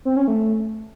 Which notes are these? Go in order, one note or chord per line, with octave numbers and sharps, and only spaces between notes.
C4
C#4
A3